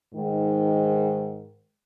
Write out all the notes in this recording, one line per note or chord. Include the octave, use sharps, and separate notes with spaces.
G#2 D#3